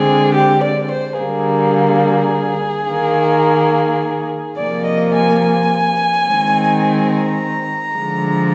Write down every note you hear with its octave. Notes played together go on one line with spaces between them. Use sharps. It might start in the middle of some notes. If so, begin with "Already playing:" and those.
Already playing: D3 G#3 C4 G#4
G4
D5
C5
D3 G3 A#3 G#4
D#3 A#3
C3 F3 A#3 D5
D#5
G#5
G#5
D#3 G#3 C4
A#5
D3 F3 G#3